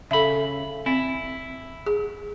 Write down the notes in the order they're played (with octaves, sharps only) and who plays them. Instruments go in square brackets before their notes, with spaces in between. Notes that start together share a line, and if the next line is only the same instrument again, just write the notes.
[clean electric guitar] C#3 B5 [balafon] A4 E5
[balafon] C4 [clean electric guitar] E4
[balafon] G#4